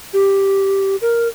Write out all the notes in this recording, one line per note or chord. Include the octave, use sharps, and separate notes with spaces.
G4
A#4